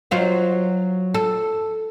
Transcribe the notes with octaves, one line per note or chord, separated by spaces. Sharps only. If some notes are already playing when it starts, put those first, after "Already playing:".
F#3 F4 C5
A4